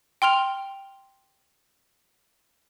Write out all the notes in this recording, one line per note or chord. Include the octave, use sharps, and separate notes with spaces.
G5 C6 F6 F7